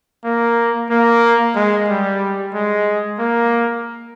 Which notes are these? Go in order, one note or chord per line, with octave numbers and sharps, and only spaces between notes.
A#3
A#3
G#3
G3
G#3
A#3